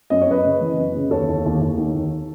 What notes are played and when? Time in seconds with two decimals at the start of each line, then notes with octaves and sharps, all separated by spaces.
0.10 F#2 D#5
0.21 C#5
0.27 F#2 B4 D#5
0.44 C#3
0.61 E3
0.78 F#2
0.95 C#3
1.11 D#2 A4 C#5
1.29 D#2
1.45 D#2
1.61 D#2
1.78 D#3
1.95 D#2